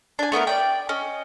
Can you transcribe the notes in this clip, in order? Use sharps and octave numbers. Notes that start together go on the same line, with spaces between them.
D4 G#5
A3 B3 E4 A#4
D5 D#5 G5
C#4 D#5